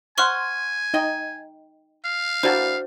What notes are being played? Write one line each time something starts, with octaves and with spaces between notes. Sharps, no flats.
C5 F#5 G#5 C6 C#6 F6
D#4 D#5 G5
F5
E3 A#3 D4 F#4 C5 A5